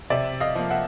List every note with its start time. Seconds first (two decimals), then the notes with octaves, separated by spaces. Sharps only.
0.10 C3 D5 E5
0.40 D#5 F5
0.55 F3 A#3
0.70 E5 F#5